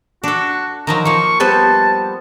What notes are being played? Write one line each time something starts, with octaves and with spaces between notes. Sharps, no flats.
D4 F#4 A4
D#3 F3 F#3 A#5
F3 A#3 C#6
G3 B3 C5 A5